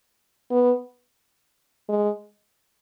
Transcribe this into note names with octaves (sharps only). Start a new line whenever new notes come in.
B3
G#3